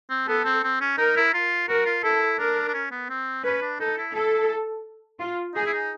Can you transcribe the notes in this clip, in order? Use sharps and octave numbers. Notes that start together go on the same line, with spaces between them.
C4
B3 A4
C4
C4
C#4
D#4 A#4
E4
F4
F#4 A#4
F4
E4 A4
D4 A#4
D4
C#4
B3
C4
C#4 B4
D4
D#4 A4
E4
E4 A4
F4
D#4 G#4
E4
D#4